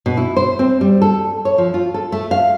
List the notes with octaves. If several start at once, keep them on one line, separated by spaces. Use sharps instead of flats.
B2
E4
C5
C4
G3
A4
C#5
F3
F4
A4
A3
F5